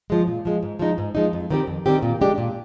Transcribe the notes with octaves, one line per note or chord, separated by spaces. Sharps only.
F3 G#3
A#2
F3 G#3
G#2
F3 G#3 D#4
G#2
F3 G#3 D#4
F2
D#3 G3 C4 G4
F2
D#3 G3 C4 G4
A#2
G#3 D4 G4
A#2